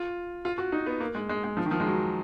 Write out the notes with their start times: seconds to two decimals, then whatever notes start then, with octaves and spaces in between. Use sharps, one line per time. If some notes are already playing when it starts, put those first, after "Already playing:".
Already playing: F4
0.45 F4
0.58 F#4
0.72 D#4
0.86 B3
1.00 A#3
1.15 G#3
1.29 G#3
1.44 G#3
1.57 F3
1.66 D#3
1.71 F3
1.80 G#3
1.86 F#3